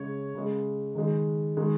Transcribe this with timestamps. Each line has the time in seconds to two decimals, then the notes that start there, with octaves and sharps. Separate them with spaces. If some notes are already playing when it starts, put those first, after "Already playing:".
Already playing: C#3 G#3 C#5
0.35 C#3 G#3
0.95 D#3 G#3
1.57 D#3 G#3